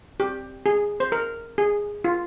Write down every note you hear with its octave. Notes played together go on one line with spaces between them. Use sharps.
G4
G#4
C5
A#4
G#4
F4